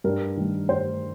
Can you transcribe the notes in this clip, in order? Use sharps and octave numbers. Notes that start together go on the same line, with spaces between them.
G2 A#4
D#3 G3
G2 C5